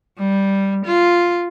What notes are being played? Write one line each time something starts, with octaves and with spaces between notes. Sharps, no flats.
G3
F4